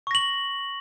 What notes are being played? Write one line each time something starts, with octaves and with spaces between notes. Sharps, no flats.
C#6 A#6 F#7